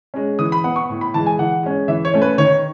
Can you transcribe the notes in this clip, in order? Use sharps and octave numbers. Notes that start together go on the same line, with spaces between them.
G#3 C#4
E3 D#6
B5
B3 F#5
C#6
A2
B5
E3 G#3 A5
G#5
E3 F#5
G#3 C#4
E3 E5
C#5
A3 C#4
B4
D#3 C#5